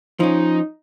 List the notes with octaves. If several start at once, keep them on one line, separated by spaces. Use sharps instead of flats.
F3 C#4 D#4